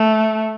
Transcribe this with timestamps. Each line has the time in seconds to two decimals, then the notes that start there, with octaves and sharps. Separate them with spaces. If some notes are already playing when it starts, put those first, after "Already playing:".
Already playing: A3